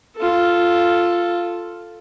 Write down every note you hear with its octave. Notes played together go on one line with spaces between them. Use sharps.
F4 A4